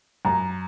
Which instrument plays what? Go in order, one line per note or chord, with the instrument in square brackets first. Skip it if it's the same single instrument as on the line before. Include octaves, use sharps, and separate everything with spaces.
[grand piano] F#2 [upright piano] A#5